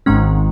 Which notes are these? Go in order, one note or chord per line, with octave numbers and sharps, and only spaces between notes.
G#1 G#2 D#3 G#3 C#4